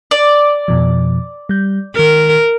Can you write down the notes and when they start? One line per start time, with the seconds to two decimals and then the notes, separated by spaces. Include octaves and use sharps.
0.11 D5
0.68 F2 B2 F3
1.49 G3 G6
1.96 D#3 A#4 F6